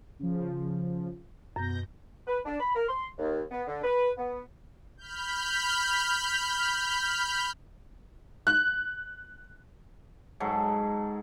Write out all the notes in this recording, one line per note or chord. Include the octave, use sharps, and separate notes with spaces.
C#3 F3
F#2 B2 G6 A#6
B4
D4
B5
A#4
C6
D#2
B3
D3
B4
B3
B5 F6 G6
F#6
G#2 F#3 A4